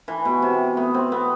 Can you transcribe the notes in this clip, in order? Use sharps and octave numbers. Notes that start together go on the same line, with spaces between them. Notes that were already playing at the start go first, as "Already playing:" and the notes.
E3
B2
C3
B3
C4
B3